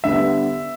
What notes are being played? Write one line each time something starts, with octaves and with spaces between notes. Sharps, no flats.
D3 G3 B3 E5